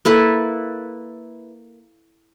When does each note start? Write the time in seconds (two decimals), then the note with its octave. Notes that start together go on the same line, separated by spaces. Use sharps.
0.05 A#3 E4 A4 B4